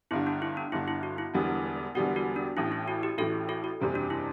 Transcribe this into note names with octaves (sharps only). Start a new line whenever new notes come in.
G1 G2 D3 E4
D4
E4
D4
G1 G2 D3 E4
E4
F#4
E4
E1 E2 D3 G3 B3
E1 E2 D3 G3 B3 F#4
F#4
D4
A1 A2 E3 E4
E4
F#4
G4
A1 A2 E3 F#4 A4
F#4 A4
F#4
F#1 E2 C3 G3
D4
E4